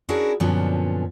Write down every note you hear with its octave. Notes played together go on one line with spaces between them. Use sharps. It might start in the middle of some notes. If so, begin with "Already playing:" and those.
C#4 D4 E4 F#4 G#4 A#4
F#2 A#2 D3 F3 B3 C#4